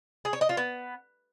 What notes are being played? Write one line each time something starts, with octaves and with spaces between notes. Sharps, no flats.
G#4
C#5
D#5
F4
B3